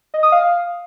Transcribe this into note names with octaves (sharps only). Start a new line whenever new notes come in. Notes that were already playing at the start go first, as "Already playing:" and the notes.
D#5
D#6
F5